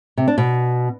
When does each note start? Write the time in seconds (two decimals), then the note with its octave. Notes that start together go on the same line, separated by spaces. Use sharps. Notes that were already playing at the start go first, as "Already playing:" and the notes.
0.17 C3
0.28 D4
0.38 B2